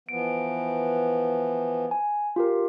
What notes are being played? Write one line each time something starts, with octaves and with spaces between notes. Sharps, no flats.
E3 F3 B3 D7
G#5
F4 G4 A#4